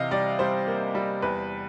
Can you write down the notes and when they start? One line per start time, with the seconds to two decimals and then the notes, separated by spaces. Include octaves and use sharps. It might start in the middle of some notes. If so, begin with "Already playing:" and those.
Already playing: C3 E3 D#5 F5
0.11 G3 D5
0.39 G3 C5
0.67 A#3
0.95 G3
1.22 E2 B4